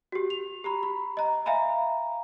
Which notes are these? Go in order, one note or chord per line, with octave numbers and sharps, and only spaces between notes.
F#4 G4
F7
G4 A#5 B5
B5
D#5 A#5
E5 F5 G#5 A#5 B5